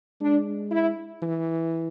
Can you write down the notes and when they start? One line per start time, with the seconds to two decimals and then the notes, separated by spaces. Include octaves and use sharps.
0.21 G#3 D4
0.72 E4
1.22 E3